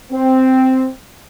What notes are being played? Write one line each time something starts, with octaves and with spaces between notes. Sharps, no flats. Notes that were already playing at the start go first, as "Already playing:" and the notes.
C4